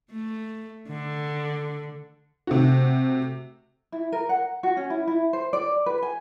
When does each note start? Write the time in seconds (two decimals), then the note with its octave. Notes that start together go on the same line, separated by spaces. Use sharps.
0.11 A3
0.88 D3
2.47 C3 A3 F#4
3.92 E4
4.12 A#4
4.29 F#5
4.63 F#4
4.77 C#4
4.90 E4
5.07 E4
5.33 C5
5.53 D5
5.86 B4
6.02 G#5